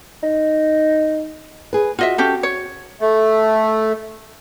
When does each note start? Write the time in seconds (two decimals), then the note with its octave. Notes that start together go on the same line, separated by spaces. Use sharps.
0.23 D#4
1.73 G#4 B4
1.99 F4 F#4 D#5 E5
2.18 C#4 G4 A4
2.43 C#5
3.01 A3